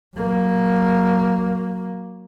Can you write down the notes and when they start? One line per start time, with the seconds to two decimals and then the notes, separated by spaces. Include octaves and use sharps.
0.17 F#3 A#3